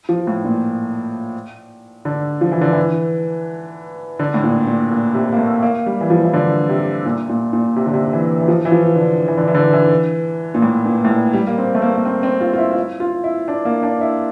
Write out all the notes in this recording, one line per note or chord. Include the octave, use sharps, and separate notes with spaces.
F3
A2
A#2
D3
F3
E3
D3
E3
D3
A2
A#2
A#2
A#2
C3
A#3
A3
A#3
G3
E3
F3
E3
D3
C3
A#2
A#2
A#2
C3
D3
C3
E3
E3
F3
E3
F3
D3
E3
D3
E3
D3
E3
A#2
A2
A#2
A2
A#2
G3
A#3
C4
A3
A#3
A#3
C4
C4
F4
F4
E4
F4
E4
F4
E4
D4
A#3
D4
E4